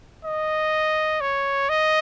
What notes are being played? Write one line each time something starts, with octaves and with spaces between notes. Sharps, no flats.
D#5
C#5
D#5